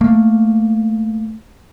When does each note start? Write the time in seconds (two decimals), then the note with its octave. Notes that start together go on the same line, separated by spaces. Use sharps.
0.01 A3 A#3